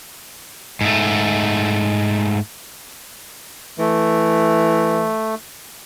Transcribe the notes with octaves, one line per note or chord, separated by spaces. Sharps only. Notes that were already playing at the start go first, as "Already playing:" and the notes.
G#2 A3
E3 A3